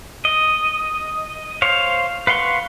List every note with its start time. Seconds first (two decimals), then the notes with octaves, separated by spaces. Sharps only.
0.25 D#5
1.62 C5 C#5 F5
2.27 B4 F5 F#5 C6 C#6